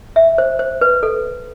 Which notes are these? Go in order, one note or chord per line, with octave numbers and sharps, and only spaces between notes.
E5
C5
C5
B4
A4